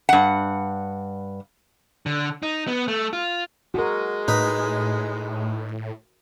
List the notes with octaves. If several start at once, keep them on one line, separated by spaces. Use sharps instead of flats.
G2 F#5
D3
D#4
B3
A3
F4
G#3 F#4 G#4 A#4
A2 D#4 B4